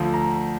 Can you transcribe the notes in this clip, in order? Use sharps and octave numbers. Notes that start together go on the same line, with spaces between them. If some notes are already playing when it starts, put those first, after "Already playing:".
Already playing: D2 D3 F3
A#5